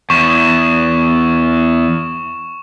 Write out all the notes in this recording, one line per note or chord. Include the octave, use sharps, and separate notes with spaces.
E2 C#6 E7